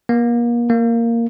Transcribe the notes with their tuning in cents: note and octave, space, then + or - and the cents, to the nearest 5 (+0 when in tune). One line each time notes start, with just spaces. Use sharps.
A#3 +35
A#3 -5